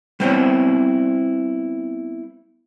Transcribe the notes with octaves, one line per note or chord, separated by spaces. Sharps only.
G3 B3 C4 E4 C5 C#5